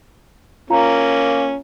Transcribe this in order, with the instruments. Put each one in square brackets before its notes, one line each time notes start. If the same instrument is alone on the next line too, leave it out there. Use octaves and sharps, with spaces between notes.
[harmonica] A#3 C#4 [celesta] F4 F5 A#5